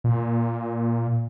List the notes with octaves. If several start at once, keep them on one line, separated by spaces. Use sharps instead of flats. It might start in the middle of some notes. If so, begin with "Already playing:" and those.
A#2